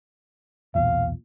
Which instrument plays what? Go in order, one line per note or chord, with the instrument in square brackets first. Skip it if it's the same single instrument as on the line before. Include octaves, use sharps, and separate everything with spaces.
[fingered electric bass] B1 E2 A#2 [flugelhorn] F5